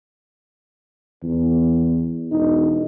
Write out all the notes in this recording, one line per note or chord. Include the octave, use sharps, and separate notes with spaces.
E2
E1 D#4